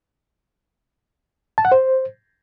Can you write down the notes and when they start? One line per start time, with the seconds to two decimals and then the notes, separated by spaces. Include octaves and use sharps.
1.58 A5
1.65 F#5
1.72 C5